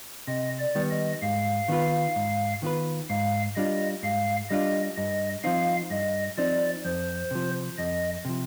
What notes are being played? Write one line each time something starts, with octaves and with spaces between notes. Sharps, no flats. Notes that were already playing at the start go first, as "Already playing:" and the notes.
C3 D#5
D5
D#3 G3 B3
D#5
G#2 F5
D#3 B3 F4 B4
G#2
D#3 B3 F4 B4
G#2 F5
G3 D4 F4 D#5
G#2 F5
G3 D4 F4 D#5
G2 D#5
F3 C4 D#4 F5
G2 D#5
F3 C4 D#4 D5
F2 C5
C3 F3
F2 D#5
C3 F3